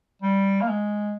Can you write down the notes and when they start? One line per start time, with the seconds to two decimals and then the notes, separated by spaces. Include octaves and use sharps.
0.22 G3
0.61 A#3
0.68 G#3